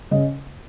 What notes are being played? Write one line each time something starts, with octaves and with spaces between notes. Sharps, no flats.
C#3 D#5